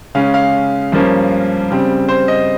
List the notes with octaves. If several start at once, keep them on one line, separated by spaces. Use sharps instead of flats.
C#3 G#3 C#4 F5
F5
G2 F3 A#3 C#4
C#3 G3 C4
C5
D#5